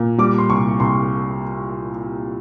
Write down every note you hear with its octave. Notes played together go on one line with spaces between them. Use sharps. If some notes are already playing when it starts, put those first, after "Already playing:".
Already playing: A#2
G3 D6
C6
C2 C#6
C2 C6